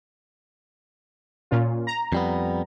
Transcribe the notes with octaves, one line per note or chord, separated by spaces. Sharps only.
A#2 C#4 F4
A#5
F2 G3 B3